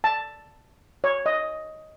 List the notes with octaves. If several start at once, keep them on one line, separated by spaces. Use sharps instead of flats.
A5
C#5
D#5